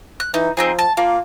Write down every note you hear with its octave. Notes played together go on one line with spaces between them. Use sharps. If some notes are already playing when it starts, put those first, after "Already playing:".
F#6
E3 D#4
F3 C4 D#4 G#4
A5
A#3 F4